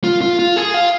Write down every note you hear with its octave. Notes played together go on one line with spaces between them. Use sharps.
F4
F4
F4
G#4
F4